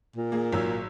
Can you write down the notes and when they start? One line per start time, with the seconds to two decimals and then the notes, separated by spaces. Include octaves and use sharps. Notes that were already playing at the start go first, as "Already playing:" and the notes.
0.16 A#2
0.32 A#3 G#4
0.53 G#1 F#3 E6